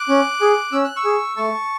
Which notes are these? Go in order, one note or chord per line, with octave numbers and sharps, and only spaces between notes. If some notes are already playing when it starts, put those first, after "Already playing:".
Already playing: D6 F#6
C#4
G#4
C#4 E6
F#6
C#6 E6
G#4
A3 A5 C#6